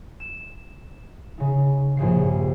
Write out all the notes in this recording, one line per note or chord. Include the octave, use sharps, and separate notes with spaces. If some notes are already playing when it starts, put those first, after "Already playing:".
E7
C#3 D#4
A#1 G2 C#3 C7